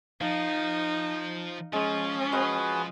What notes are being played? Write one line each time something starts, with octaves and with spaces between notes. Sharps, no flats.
F3 D#4 F5
F3 G#3 C#4 F4
F#4 G#4 B4 D#5